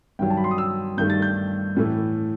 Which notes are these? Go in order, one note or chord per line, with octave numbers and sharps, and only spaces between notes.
G2 D#3 F#3 G5
A5
B5
C6
D#6
E6
G2 D#3 A3 G6
A6
G6
A2 E3 A3